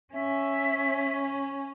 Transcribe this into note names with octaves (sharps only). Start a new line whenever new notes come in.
C#4 E5